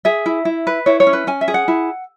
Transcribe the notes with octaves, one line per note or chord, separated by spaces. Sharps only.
G#4 E5
E4
E4
B4
E4 C#5
C#5
C#4
B4
C#4 G#5
E5
G#4
F#5
E4